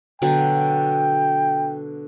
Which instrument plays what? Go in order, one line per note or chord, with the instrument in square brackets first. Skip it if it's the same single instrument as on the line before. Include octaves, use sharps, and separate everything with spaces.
[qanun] B2 D3 F#3 [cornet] G5